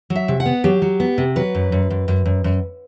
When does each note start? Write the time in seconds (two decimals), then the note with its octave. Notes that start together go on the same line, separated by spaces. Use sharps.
0.10 F#3
0.16 E5
0.28 C3
0.40 F#5
0.46 B3
0.64 F#3 G4
0.82 F#3
1.00 B3
1.18 C3
1.36 F#3 B4
1.55 F#2
1.72 F#2
1.90 F#2
2.08 F#2
2.26 F#2
2.44 F#2